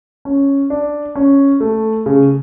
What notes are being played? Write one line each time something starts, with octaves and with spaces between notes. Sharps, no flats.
C#4
D4
C#4
A3
C#3